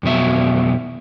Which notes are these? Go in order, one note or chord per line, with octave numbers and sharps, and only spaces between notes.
F2 B2 F#3 E5